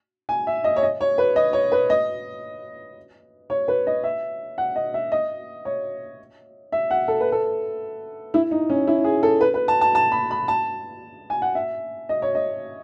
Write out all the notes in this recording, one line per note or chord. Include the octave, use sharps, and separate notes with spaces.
G#5
E5
D#5
C#5
D#5
C#5
B4
D#5
C#5
B4
D#5
C#5
B4
D#5
E5
F#5
D#5
E5
D#5
C#5
E5
F#5
A4
B4
A4
E4
D#4
C#4
E4
G#4
A4
B4
B4
A5
A5
A5
B5
B5
A5
G#5
F#5
E5
D#5
C#5
D#5